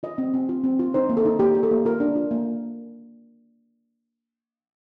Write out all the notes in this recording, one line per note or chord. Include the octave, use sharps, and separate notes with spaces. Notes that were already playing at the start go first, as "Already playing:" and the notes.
F4 D#5
C4
C4
F4
C4
F4
D#4 C5
A#3
A4
D#4
A#3 G4
G4
A4
A#3
F4 A#4
D4
F4
A#3